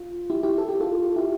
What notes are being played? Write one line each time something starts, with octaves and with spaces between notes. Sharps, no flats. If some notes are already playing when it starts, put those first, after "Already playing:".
Already playing: F4
E4 G4
E4 G4
A4
G4
F4 A4
E4 G4